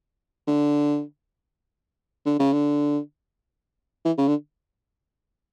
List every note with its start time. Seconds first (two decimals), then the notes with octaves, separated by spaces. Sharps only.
0.48 D3
2.26 D3
2.40 C#3
2.53 D3
4.05 E3
4.18 C#3
4.28 D3